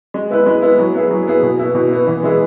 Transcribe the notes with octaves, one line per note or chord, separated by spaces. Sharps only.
G#3
B3 E4 B4
G#3
B3 E4 B4
F#3
B3 E4 G#4
F#3
B3 E4 G#4
B2
B3 E4
B2
B3 E4
E3
G#3 B3 E4 G#4